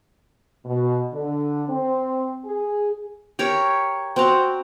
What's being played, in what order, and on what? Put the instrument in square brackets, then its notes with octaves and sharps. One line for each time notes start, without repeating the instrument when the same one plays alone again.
[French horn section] B2
D3
C4
G#4
[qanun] G4 A#4 C#5
C4 F#4 D5 A#5